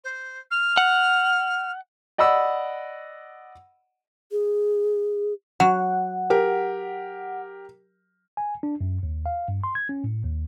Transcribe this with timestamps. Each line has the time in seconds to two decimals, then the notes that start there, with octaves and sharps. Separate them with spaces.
0.04 C5
0.50 F6
0.77 F#5
2.18 D5 D#5 F#5 B5 E6
4.32 G#4
5.60 F#3 F#5
6.30 G4 A#4
8.37 G#5
8.63 D4
8.81 F#2
9.03 D#2
9.26 F5
9.48 G2
9.64 C6
9.75 G#6
9.89 C#4
10.04 A2
10.24 D#2